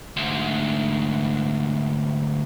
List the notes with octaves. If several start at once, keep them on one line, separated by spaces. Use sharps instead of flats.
D2 G#2